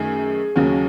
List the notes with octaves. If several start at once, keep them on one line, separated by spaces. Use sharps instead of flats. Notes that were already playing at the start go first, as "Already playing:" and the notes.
Already playing: F#2 D#3 A3 G#4
D#2 C#3 F#3 C#4